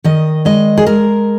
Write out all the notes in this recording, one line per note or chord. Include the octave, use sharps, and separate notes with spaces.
D#3 D#5
G#3 D#5
G#4
G#3 A#4